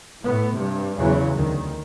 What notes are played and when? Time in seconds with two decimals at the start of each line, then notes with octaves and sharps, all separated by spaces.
0.23 A2 B3
0.56 G2 C3
0.98 E2 C#3 E3 F#3
1.36 D2 D#3